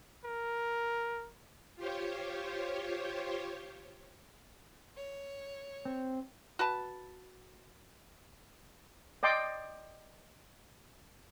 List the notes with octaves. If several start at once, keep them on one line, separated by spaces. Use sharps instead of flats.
A#4
F4 G4 C5 C#5
C#5
C4
F#4 B4 A5
D5 D#5 G5 C6 D6